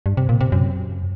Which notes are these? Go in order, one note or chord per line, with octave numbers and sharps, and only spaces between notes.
G2
C3
A#2
C3
F#2